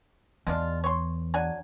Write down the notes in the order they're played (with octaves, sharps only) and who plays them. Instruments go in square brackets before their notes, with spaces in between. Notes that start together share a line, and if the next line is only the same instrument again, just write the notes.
[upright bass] E2 [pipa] G#3 D4 F4
[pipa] C#5 C6
F#3 D4 G#5